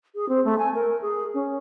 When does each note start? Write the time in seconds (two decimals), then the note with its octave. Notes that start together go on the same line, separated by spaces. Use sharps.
0.15 G#4
0.29 C4
0.45 A3
0.58 G#5
0.74 A#4
1.02 G#4
1.34 C#4